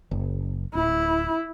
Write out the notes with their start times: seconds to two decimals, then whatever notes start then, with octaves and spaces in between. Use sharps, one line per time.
0.11 F#1
0.75 D1 E4